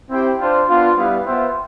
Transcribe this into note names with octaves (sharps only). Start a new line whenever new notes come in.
C4 E4 G4 C5 G5
D4 F4 C5
B3 D4 F4
G3 B3 E4 B4 F5
B3 F4 C5 E5 G5